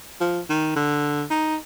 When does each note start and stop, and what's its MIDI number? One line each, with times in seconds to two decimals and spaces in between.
0.20 0.40 53
0.50 0.75 51
0.76 1.24 50
1.30 1.56 63